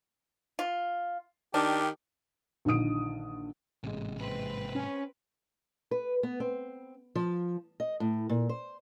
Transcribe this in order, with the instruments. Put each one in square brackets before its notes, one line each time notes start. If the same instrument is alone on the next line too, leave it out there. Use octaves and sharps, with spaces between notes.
[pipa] F4
[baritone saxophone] D#3 [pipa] D4 [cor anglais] G4
[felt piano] A#1 D3 D#3 D#6 D7
[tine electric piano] A1 G#3 [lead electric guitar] G#2 C3
[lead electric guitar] G#2 C3 [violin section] C4 B4
[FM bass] C#4
[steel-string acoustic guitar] B4
B3
C4
F3
D#5
A2
A#2
C5